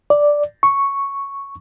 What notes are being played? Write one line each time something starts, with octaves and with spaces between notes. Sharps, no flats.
D5
C#6